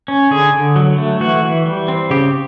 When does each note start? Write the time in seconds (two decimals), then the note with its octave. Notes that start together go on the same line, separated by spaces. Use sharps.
0.08 C#4
0.31 D3 G#4
0.54 D3
0.76 F#3
0.98 A3
1.20 E3 F#4
1.43 E3
1.66 G3
1.88 C4
2.10 C#3 G4